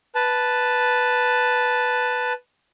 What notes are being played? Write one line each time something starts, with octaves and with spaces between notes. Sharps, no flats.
B4 A5